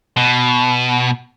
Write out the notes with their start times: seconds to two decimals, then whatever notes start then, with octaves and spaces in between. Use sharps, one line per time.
0.17 B2